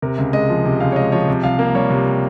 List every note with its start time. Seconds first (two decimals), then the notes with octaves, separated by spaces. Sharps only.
0.02 C3 A#4
0.18 C#2
0.33 G#3 D#5
0.49 F3
0.65 C3
0.80 C#2 F5
0.92 C#5
0.96 G#3 D#5
1.12 F3 C#5
1.28 C3
1.43 C2 F5
1.59 A#3
1.75 G3 C#5
1.90 C3